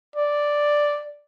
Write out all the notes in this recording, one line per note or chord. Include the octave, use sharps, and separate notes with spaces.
D5